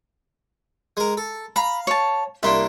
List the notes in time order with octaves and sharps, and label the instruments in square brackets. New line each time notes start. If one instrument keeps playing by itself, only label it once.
[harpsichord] G#3 A#4
A4
[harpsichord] F5 [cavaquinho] A#5 B5
[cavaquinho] C#5 A5
[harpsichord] C2 A#3 D4 [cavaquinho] E5 C6